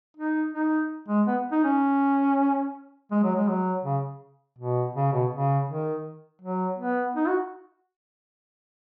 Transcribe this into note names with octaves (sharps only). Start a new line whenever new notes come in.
D#4
D#4
G#3
B3
D#4
C#4
G#3
F#3
G#3
F#3
C#3
B2
C#3
B2
C#3
D#3
F#3
B3
D#4
F#4